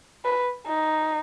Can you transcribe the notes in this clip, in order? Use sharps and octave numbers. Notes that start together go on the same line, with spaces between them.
B4
D#4